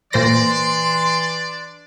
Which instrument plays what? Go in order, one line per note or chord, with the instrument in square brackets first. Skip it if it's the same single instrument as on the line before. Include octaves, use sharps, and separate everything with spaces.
[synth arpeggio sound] A#2 C5 A#6 [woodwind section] E3 C6 [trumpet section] D4 D5